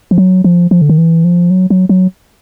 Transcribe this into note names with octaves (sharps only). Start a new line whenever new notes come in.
F3
F#3
F3
F3
D3
D#3
E3
F3
F#3
F#3
F#3